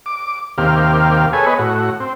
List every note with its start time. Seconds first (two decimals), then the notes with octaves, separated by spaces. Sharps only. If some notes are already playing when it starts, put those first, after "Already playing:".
0.06 D6
0.58 D#2 C3 A#3 G4 F5
1.33 G#4 A4 B4 C#5 G#5
1.46 B3 G#4 B4 C#5 D#5
1.59 A2 F#4
2.00 C4